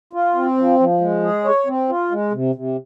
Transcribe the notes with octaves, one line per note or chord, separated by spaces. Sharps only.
F4
C4
F3
F3
G#3
G#4
C#5
C4
F4
G#3
C3
C3